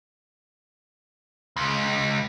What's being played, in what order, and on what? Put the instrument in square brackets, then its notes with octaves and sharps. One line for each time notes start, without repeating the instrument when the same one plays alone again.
[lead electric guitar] C#2